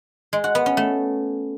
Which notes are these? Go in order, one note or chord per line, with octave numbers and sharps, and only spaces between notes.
G#3
F#4
B3
C#4
A3